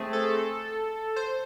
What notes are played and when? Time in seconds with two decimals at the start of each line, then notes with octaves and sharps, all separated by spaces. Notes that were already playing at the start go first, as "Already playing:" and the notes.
Already playing: A3 C4 G#4
0.13 A4
1.16 C5